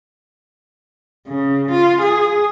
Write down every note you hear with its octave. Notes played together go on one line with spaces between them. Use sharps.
C#3
F4
G#4